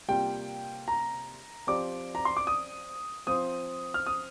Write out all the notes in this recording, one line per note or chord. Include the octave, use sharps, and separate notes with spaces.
C3 G3 A#3 F4 G5
A#5
F3 C4 G4 D5 D6
A#5
C6
D6
D#6
F3 C4 F4 C5 D#6
F6
D#6